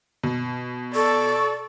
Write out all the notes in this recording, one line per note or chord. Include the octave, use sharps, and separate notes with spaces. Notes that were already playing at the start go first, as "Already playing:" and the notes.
B2
A4 D5 C#6